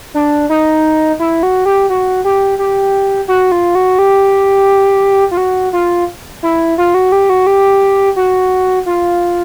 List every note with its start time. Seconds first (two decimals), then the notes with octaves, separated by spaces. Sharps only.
0.14 D4
0.49 D#4
1.19 E4
1.43 F#4
1.65 G4
1.90 F#4
2.24 G4
2.59 G4
3.28 F#4
3.52 F4
3.75 F#4
3.99 G4
5.31 F4
5.37 F#4
5.73 F4
6.43 E4
6.78 F4
6.94 F#4
7.12 G4
7.30 F#4
7.47 G4
8.16 F#4
8.86 F4